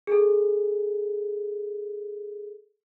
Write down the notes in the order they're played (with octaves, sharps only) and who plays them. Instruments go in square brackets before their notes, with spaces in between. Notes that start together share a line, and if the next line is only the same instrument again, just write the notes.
[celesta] G#4 A4